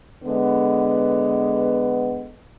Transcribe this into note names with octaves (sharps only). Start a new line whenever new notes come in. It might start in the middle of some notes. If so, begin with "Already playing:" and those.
D3 G#3 B3